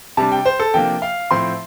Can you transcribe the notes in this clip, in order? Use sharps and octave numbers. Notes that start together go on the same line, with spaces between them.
C3 G3 D4 A5
G5
C5
A4
C3 F3 A#3 D4 G5
F5
A2 F3 C4 C6